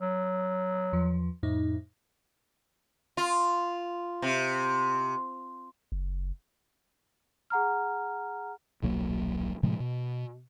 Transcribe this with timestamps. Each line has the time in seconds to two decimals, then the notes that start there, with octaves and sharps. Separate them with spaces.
0.01 F#3
0.93 E2 F3
1.43 F2 A2 D#4
3.17 F4
4.22 C3
5.92 F#1
7.50 G#4 F#5 A#5 F6
8.82 D#1 B1 F#3 A#3
9.63 A2 C3 F3 G#3
9.80 B2